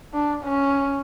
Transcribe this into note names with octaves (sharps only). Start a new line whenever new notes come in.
D4
C#4